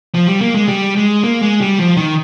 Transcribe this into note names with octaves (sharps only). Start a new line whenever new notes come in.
F3
G3
A#3
G#3
G3
G#3
A#3
G#3
G3
F3
D#3